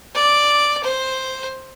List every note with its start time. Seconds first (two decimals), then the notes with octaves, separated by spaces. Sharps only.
0.15 D5
0.83 C5